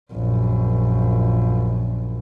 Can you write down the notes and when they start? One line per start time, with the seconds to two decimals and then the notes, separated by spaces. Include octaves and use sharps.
0.13 A#1 F#2